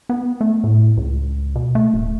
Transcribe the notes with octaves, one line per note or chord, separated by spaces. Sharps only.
B3
A3
A2
C#2
B2
A3
D#1